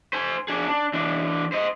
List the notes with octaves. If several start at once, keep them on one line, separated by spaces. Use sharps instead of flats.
C5 G#5
D4 G#4
D4
E3 D4
C5 D#5